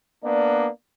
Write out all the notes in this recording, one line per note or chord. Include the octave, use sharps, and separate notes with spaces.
A#3 B3 D4 D5